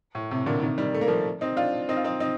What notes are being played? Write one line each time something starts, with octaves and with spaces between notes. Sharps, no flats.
A2
A2 C3
A#2 D3
C3 D#3
D#3 G3
A3
A#3
F3 A3
C4 D#4
D4 F4
C4 D#4
F4
C4 D#4
C4 D#4